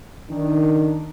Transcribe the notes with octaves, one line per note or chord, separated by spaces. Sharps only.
D#3 D4